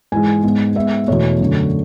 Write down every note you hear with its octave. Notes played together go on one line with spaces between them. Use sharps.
G#2 E3 G#3 G#5
G#2 G#3 B3
G#2 G#3 B3 E5
E2 B2 A3 C#5
F#2 D3 A3